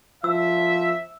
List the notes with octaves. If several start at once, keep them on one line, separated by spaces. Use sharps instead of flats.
F3 E5 E6